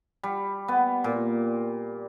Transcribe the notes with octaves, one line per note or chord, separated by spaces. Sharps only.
G3
B3
A#2